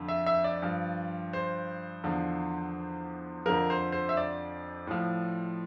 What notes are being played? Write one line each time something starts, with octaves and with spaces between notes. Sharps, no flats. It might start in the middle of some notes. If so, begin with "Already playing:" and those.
Already playing: F2 D3 F3
E5
E5
D5
G2 F3
C5
E2 D3 F3
F2 D3 F3 A#4
C5
C5
E5
D5
A2 F3